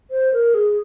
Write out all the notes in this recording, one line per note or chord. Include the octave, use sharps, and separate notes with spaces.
C5
A#4
G#4